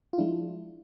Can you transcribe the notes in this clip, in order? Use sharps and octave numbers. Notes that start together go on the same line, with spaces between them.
F4
F3 G#3 D4 E4